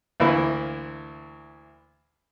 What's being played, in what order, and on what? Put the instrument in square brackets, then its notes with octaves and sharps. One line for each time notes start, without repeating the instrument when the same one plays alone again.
[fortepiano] D2 E3 A#3 E4 B4 B5